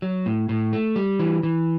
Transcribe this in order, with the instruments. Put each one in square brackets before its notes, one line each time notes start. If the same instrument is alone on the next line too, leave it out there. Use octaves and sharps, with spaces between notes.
[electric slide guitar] F#3
A2
A2
A3
G3
E3
E3